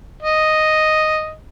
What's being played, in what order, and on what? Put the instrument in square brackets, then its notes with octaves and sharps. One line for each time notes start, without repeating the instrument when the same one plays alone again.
[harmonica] D#5